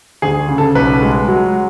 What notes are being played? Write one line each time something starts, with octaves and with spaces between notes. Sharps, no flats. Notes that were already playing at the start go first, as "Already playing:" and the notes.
D2 G#4
C#3
A4
B1 B4
G#3
F#3